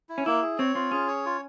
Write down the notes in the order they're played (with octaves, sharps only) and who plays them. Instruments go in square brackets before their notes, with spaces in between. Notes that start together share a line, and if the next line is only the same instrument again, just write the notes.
[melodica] E4
[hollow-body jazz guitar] C#4
[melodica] A#3 [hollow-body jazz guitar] E4
[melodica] G#4
[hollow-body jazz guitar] C4 [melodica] C#5
[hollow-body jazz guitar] C4 [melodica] F4
[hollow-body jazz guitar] C#4 [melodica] G#4
[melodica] C#5
F4